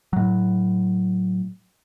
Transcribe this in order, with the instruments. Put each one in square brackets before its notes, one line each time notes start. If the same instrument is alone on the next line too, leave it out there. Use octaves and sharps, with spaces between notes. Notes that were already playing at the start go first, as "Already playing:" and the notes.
[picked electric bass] A2 F#3